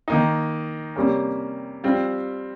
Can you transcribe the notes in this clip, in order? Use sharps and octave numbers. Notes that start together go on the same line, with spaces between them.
D#3 A#3 D#4
C3 G3 A#3 C#4
G3 C4 F4